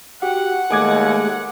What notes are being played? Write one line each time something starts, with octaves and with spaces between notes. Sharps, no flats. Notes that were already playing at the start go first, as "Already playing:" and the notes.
F#4 G4 F#5
D#2 G#3 A3 G#5 D6 G#6